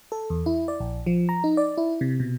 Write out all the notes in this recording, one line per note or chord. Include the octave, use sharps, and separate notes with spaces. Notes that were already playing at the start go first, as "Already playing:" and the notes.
A4
E2
E4
D5
A#1
F3
A#5
D#4
D5
E4
C3
B2